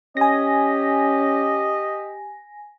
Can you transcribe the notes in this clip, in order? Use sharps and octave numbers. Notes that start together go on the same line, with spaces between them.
C#4 G4 D#5 G#5 A#6